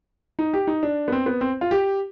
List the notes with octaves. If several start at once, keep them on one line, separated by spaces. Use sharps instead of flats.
D#4
G4
D#4
D4
B3
C4
B3
C4
F4
G4